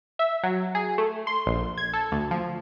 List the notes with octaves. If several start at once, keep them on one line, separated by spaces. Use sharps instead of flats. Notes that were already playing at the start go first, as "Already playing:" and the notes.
E5
F#3
G#4
A3
C6
A#1
G#6
A4
D2
F3